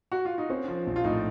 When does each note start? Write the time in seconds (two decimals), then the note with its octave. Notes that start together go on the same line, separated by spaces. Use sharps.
0.12 F#4
0.25 F4
0.38 D#4
0.50 C4 C#4
0.68 F3
0.87 A#1
0.96 F4
1.04 A2 D#4